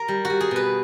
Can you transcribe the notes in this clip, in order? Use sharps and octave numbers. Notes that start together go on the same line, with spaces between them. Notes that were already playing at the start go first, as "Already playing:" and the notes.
Already playing: A#4
G3
F#4
G3
G#4
B2 B4